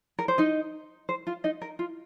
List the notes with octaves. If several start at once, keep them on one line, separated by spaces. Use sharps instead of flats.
A#4
C5
D#4 D#5
C5
F4 F5
D#4 D#5
A#4
F4